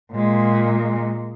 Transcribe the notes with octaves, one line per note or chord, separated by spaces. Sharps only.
A#2 G#3